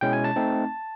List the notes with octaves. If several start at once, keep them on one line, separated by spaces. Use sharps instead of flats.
B2 G#3 C#4 E4 G5
G#5
A5
A3 C4 D#4